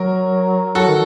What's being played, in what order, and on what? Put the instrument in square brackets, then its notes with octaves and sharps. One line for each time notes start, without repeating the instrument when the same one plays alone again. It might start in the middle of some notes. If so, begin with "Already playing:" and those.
Already playing: [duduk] F#3 [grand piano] A#4
[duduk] F#3 [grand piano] F#4 A4
[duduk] D#3